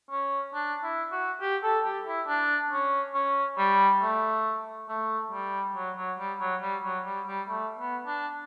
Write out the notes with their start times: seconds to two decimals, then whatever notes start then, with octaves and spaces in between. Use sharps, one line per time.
0.11 C#4
0.54 D4
0.83 E4
1.12 F#4
1.41 G4
1.63 A4
1.85 G4
2.06 E4
2.28 D4
2.71 C#4
3.14 C#4
3.58 G3
4.02 A3
4.88 A3
5.31 G3
5.75 F#3
5.96 F#3
6.18 G3
6.40 F#3
6.62 G3
6.83 F#3
7.05 G3
7.27 G3
7.48 A3
7.78 B3
8.07 D4